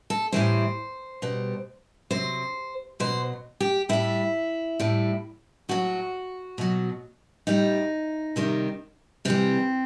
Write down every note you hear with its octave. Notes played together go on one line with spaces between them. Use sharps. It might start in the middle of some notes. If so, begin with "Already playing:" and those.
A4
A2 E3 G3 C5
B2 G3
C3 F#3 C5
B2 F#3 C5
G4
A2 G3 E4
A2 G3
A2 F#3 F#4
B2 F#3
A2 G3 D#4
C3 D#3 G3
C3 E3 G3 C4